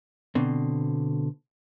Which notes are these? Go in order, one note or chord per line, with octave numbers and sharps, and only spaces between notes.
B2 D3 C4